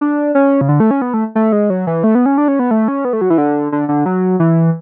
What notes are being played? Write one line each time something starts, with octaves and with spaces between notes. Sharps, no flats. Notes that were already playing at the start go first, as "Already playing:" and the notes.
D4
C#4
C#3
D3
A3
C#4
B3
A3
A3
G#3
F#3
E3
A3
B3
C#4
D4
C#4
B3
A3
C#4
B3
A3
F#3
E3
D3
D3
D3
F#3
E3